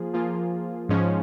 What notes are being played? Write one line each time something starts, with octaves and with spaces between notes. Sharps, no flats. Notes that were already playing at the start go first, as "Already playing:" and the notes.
Already playing: F3 A#3 F4 G#4
F3 A#3 F4 G#4
G#2 F3 G#3 C#4